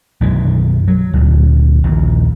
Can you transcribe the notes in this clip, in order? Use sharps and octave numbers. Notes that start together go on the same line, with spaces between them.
B1 F#2 D#3 E3
F#3
D2 A#2
A#1 D#2 A#2